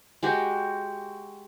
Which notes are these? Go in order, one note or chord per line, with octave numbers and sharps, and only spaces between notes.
G#3 F#4 G4